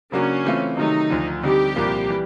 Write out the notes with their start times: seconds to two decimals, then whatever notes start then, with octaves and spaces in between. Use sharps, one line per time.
0.12 C#3 F#3 A#3 C#4 D4 F#4
0.45 E3 A3 C4 F4
0.77 C3 D#3 F#3 A3 D#4
1.10 D2 D3 F3
1.43 D3 G3 C4 D#4 G4
1.76 C2 A#2 F3 A#3
2.08 E3 G3